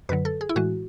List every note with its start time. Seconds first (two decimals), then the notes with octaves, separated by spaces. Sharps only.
0.09 F#2 D3 F#3 B4
0.25 A4
0.41 G#4
0.49 E4
0.56 A2 E3 G#3 F#4